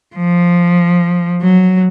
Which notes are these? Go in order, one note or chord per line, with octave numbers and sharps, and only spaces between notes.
F3
F#3